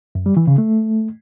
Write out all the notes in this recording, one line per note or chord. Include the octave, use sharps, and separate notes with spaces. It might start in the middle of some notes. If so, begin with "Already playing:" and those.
F#2
G3
E3
C#3
A3